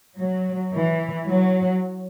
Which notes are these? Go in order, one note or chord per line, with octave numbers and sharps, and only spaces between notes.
F#3
E3
F#3